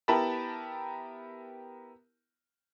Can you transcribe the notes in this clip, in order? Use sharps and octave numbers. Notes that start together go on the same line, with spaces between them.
B3 E4 G4 A#4 A5 B5